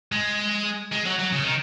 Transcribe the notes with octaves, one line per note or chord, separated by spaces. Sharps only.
G#3
G#3
F#3
F#3
C#3
D#3